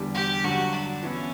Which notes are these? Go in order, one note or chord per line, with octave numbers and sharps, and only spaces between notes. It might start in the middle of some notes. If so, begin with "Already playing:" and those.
Already playing: E2 D3 G3
G4
G2 D3 F#3 F#4
D4
E3 B3 C#4 E4